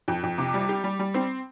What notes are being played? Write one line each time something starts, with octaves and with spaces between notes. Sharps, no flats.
F2
F2
C3
G3
G4
G3
G3
C4